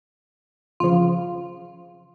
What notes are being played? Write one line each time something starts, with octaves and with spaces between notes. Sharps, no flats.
F2 C#3 F3 F4